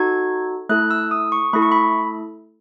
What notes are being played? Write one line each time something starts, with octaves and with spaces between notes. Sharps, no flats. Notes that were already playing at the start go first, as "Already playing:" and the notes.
Already playing: D#4 F#4 A4 G#6
A3 E4 A4 F#6
E6
D#6
C#6
A3 E4 A4 B5
C#6
B5